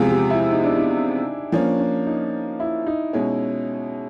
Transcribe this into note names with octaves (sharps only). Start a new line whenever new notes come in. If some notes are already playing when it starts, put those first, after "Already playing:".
Already playing: E2 C3 F3 G#3 G#4
G4
E4
D#4
D4
D#4
F3 A#3 C#4 D4
D4
D#4
E4
D#4
B2 G#3 C#4